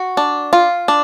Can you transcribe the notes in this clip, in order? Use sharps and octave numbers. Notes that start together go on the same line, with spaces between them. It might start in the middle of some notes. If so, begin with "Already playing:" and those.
Already playing: F#4
D4
F4
D4